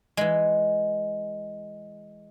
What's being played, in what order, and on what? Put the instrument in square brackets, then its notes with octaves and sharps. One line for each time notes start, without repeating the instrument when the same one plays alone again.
[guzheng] E3 G#3